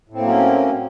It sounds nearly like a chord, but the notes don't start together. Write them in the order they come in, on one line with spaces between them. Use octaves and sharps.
A2 C4 A#3 F#3 C#4